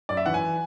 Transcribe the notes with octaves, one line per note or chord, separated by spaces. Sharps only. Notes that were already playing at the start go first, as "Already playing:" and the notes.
F#2 D5
E5
E3 F#5
G#5